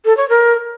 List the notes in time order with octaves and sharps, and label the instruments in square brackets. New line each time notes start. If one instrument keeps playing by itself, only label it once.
[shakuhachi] A4
C#5
A#4